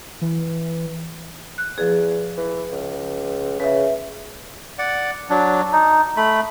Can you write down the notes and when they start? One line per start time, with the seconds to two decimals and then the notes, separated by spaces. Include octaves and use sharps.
0.21 E3
1.58 F#6
1.78 E2 F3 G#4
2.37 E3
2.72 C#2
3.60 C#3 B4 E5
4.79 D5 F#5
5.30 F#3 D4
5.73 D#4
6.17 A3 B5